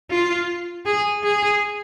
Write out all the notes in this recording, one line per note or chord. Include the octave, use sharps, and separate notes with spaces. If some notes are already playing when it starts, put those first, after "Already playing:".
F4
G#4
G#4